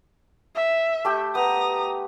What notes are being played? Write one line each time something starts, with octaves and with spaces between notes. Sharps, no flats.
E5
A3 G4
B3 A#5 D#6